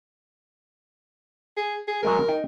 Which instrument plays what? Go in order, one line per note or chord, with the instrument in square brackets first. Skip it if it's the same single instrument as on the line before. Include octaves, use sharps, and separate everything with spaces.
[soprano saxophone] G#4
G#4
[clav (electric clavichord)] F#3 G#3 G#5 [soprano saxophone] A#4
[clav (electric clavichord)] D#4 G5